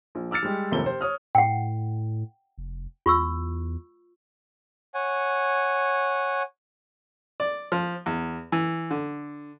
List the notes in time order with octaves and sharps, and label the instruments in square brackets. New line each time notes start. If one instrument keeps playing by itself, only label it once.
[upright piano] A#1
D6 E6 F6 A6 C#7
G3 G#3 G4
F#1 D#2 C3 F3 A3 G7
G4 C5
C#5 D#6 F6
[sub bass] A2 [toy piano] F#5 G5
[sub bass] F1
[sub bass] E2 [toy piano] F4 C#6 E6
[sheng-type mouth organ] C#5 F#5 G#5
[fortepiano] D5
F3
E2
E3
D3